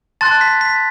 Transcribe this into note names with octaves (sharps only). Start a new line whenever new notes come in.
A5 C6 F#6 A6
B6
B6